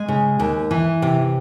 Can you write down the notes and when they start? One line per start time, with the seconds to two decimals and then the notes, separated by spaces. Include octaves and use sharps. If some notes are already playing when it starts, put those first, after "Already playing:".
Already playing: G#3 G#5
0.08 C#3
0.39 D#2
0.71 E3
1.02 C3